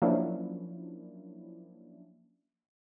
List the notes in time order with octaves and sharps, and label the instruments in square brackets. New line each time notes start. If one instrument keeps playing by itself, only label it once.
[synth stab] F3 F#3 A#3 C#4 D4 E4